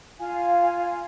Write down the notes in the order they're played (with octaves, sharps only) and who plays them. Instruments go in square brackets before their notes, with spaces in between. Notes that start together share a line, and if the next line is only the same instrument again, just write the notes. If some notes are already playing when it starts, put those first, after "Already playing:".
[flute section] F4 F5 G#5